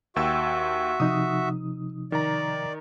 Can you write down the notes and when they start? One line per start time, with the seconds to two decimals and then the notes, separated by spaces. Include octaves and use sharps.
0.16 D#2 F#4 E5 G5 E6
1.00 C3 F3 D#4 D#6
2.12 D#3 D5 A#5